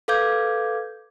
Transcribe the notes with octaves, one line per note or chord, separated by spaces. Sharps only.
A4 B4 F5 D6 G6 G#6